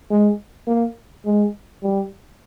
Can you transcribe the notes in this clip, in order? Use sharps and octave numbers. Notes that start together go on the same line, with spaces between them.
G#3
A#3
G#3
G3